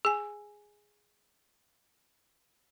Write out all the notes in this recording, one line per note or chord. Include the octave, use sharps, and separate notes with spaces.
G#4 G#5